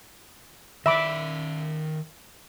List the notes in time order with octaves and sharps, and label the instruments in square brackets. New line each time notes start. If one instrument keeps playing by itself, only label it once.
[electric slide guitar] D#3 D5 [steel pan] E5 B5 D6